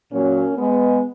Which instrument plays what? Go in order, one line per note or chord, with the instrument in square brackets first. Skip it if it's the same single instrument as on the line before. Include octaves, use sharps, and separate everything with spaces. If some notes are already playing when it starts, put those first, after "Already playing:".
[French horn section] A#2 F#3 A#3 C#4
G#3 B3